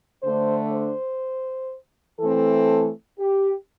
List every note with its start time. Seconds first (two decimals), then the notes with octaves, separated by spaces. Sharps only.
0.23 D3 A3 D4 C5
0.73 C5
2.20 E3 A3 C4 A4
3.19 G4